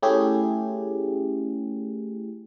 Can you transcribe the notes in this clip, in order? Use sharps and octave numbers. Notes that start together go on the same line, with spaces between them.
A3 C#4 E4 G4 G#4